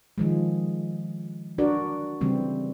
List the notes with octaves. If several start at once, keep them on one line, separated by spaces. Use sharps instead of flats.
D#3 F3 G#3
D4 F#4 A#4 D5
C#3 E3 G3 C4